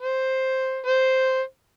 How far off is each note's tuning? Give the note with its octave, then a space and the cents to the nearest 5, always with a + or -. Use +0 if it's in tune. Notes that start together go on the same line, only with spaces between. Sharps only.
C5 +5
C5 +0